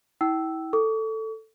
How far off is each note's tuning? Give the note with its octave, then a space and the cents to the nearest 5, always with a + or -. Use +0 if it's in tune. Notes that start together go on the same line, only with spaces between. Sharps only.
E4 -30 G5 -30 E6 +0
A4 +5 C#6 +40